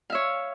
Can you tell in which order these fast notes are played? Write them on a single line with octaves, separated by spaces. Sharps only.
F5 E5 C#5